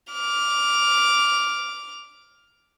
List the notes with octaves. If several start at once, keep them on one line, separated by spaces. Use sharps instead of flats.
D6 F6